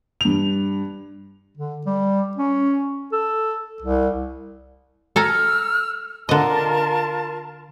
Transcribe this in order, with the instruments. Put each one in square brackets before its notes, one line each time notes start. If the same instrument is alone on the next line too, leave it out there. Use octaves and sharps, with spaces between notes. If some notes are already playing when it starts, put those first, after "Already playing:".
[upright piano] G2 F7
[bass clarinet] D3
G3
C#4
A4
C2
[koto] A4 G#5 A#5 [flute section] E6 F6
[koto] D3 D#5 [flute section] F4 A#4 A5